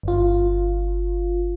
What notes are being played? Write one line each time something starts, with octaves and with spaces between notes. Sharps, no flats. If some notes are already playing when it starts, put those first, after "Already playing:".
G1 F4